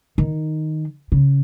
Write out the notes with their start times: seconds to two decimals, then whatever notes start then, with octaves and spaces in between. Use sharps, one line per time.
0.18 D#3
1.12 C#3